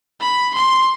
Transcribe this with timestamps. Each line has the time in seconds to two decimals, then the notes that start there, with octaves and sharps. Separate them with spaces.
0.20 B5
0.54 C6